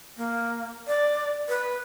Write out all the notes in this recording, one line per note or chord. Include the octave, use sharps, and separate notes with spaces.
A#3
D5
B4